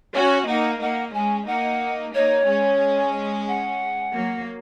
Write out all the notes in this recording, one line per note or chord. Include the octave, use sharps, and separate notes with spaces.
C#4 F#4 C#5
A#3 D#4 F#5
A#3 D#4 F#5
G#3 C#4 G#5
A#3 D#4 F#5
A#3 D#4 C#5
G#3 C#4
F#5
F#3 A#3